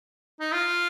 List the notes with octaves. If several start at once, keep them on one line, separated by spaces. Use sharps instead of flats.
D#4
F4